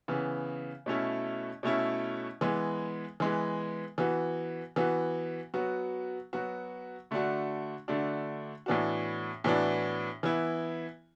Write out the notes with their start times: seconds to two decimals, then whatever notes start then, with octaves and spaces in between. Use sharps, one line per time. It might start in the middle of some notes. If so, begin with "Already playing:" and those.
0.08 C#3 E3 B3
0.86 B2 A3 C#4 E4
1.63 B2 A3 C#4 E4
2.41 E3 G#3 B3
3.20 E3 G#3 B3
3.98 E3 B3 F#4
4.76 E3 B3 F#4
5.54 F#3 B3 F#4
6.33 F#3 B3 F#4
7.11 D3 A3 D4 F#4
7.88 D3 A3 D4 F#4
8.66 A2 E3 B3 D4 F#4
9.44 A2 E3 B3 D4 F#4
10.23 E3 B3 E4